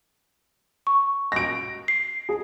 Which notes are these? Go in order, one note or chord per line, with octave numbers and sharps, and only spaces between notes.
C#6
A#6 D7
C7
G#4